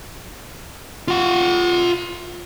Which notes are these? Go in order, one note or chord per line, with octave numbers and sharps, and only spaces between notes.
F4 F#5